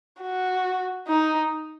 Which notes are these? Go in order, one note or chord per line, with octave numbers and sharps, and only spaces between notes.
F#4
D#4